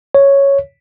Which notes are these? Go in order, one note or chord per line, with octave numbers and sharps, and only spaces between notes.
C#5